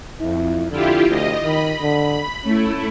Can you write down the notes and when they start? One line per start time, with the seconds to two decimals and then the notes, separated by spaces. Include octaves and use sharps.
0.20 F2 E4
0.71 D3 E4 F4 G4
1.09 D2 D#5
1.44 D#3 B5
1.82 D3
2.44 A3 C#4 E4